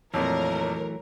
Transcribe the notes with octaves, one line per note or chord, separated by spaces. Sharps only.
F2 A#2 E3 F#3 A3 A#4 C#5